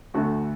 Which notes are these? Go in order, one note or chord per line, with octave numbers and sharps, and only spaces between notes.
D2 D3 A3 F#4